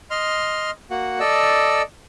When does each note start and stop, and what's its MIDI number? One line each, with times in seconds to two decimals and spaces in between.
0.11 0.71 75
0.11 0.71 84
0.11 0.71 89
0.91 1.19 58
0.91 1.19 66
0.91 1.19 78
1.20 1.82 69
1.20 1.82 74
1.20 1.82 75
1.20 1.82 88